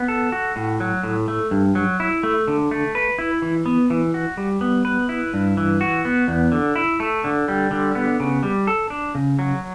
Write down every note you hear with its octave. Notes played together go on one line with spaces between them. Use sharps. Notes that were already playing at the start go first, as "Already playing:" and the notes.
Already playing: B3
A4
F#4
A2
F#3
A2
A3
G2
F#3
E4
A3
D3
A3
B4
E4
E3
B3
E3
F#4
G3
B3
B4
E4
G2
E3
F#4
B3
E2
D3
E4
A3
D3
G3
D3
B3
C#3
G3
A4
D4
C#3
F#3